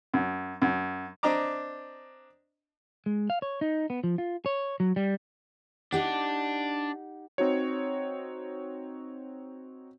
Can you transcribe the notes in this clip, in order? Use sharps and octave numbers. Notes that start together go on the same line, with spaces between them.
F#2
F#2
C4 D4 D#5 A#5 D6
G#3
F5
C#5
D#4
B3
F3
F4
C#5
F#3
G3
D4 D#4 G4 F#5
C4 D#4 F#4 C#5